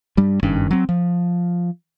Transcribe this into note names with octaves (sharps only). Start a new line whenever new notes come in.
G2 G3
F#1 G2 D#3 C#4
F#3 C4
F3